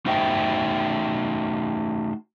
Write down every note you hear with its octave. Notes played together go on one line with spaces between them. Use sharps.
A3 D#4 F#4 C5 E5 G5